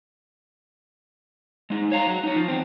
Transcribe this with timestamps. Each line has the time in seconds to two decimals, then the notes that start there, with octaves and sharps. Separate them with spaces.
1.70 G#3 D#4
1.92 C#5 F5 A#5
2.07 F#3
2.23 D#4 C#5
2.36 F3 F4
2.48 E2 C4